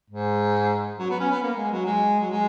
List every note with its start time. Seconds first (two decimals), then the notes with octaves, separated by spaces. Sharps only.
0.10 G#2
0.99 F#3
1.10 B3
1.20 C#4
1.31 B3
1.43 A#3
1.57 G#3
1.71 F#3
1.86 G#3
2.20 F#3
2.30 G#3